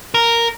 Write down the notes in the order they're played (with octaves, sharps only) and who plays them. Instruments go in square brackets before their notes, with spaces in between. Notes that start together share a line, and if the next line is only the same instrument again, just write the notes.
[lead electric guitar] A#4